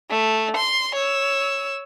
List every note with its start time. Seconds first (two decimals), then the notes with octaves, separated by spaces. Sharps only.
0.10 A3
0.57 C6
0.95 C#5 E6